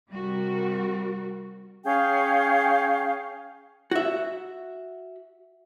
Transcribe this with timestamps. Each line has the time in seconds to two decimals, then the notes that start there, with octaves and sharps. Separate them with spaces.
0.11 C3 G3 F#4 A#4
1.85 C#4 G#4 F5 G5
3.91 F#4 E5